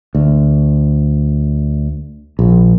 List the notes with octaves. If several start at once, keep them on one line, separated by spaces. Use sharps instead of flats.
D2
A#1